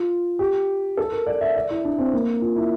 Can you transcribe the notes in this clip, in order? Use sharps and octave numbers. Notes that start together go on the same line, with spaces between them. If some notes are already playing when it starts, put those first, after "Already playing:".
Already playing: F4
G4
A4
A#4
D5
E5
D5
E4
D4
C4
A#3
F4
E4